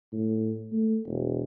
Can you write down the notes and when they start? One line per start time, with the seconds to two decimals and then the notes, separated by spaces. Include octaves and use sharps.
0.13 A2
0.72 A3
1.07 E1